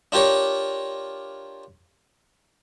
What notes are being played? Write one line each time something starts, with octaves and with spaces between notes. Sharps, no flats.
D4 F4 G4 A#4 C#5